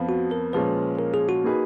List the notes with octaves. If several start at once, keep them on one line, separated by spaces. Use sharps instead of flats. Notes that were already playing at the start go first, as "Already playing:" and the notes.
Already playing: F2 F3 B3
F#4
A#4
A#2 F3 G#3 C#4 B4
A#4
G#4
F#4
A#3 D#4 G#4 B4